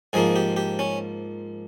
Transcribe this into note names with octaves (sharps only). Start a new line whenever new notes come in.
G#2 F3 A#3 G#4
G4
G4
C#4